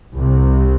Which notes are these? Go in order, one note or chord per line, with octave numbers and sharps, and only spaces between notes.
C2 C3